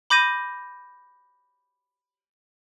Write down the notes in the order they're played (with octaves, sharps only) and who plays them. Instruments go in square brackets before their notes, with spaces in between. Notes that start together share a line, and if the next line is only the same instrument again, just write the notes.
[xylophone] B5 D6 G6 A#6 D#7